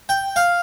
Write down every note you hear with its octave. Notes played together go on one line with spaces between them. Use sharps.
G5
F5